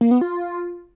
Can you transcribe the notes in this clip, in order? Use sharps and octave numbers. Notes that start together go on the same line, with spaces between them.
A#3
B3
F4